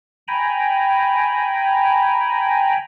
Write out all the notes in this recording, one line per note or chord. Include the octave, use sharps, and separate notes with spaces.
G5 G#5 A#5 B5